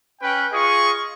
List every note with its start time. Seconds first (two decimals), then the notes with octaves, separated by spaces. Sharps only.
0.21 C#4 B4 G5
0.53 F4 G#4 D#5 C#6